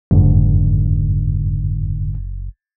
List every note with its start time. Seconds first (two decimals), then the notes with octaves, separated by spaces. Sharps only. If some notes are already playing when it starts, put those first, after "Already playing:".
0.11 F#1 F2 G#2 D3